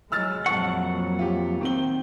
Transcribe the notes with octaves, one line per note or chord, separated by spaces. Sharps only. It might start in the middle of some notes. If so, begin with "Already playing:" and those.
F#3 G#3 E6 F6 A6
F2 A#2 E3 F#3 F#5 A5 C#6
F4 G4
D#3 C4 G7